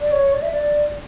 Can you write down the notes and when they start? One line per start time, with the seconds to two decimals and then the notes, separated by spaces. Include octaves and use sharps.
0.01 D5
0.12 C#5
0.33 D5
0.42 E5
0.51 D5